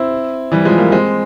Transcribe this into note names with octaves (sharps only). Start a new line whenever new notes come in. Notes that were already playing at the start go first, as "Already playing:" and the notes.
Already playing: C4 E4
E3 G3
F3 G#3
G3 A#3
G#3 C4